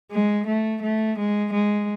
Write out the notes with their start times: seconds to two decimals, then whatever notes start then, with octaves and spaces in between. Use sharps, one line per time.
0.12 G#3
0.47 A3
0.82 A3
1.18 G#3
1.52 G#3